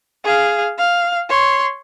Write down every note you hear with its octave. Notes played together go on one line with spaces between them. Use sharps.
G#4 F5
F5
C#5 C6